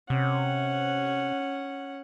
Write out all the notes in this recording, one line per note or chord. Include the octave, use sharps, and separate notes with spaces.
C3 C#4 F#5